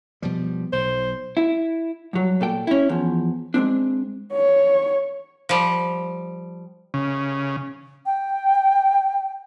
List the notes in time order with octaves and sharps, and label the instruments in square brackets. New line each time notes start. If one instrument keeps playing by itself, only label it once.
[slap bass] B2 F3 G3
[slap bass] B1 [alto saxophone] C5
[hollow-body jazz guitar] E4
G2 F#3
A#2 A4 G5
C#4 E4
E2 F3
G#3 A#3 C4 D4
[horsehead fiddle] C#5
[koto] F3 G3
[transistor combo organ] C#3
[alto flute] G5